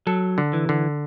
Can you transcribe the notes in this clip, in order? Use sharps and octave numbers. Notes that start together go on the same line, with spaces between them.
F#3 A4
D3
E3
D3